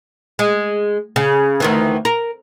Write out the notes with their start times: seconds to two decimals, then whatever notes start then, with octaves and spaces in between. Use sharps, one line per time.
0.39 G#3
1.16 C#3
1.60 D2 D#3 E3
2.05 A#4